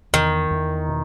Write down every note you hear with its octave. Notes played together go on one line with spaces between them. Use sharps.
E2 D#3
E2
B2